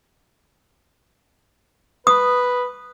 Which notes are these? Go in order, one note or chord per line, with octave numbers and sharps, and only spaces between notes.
B4 D#6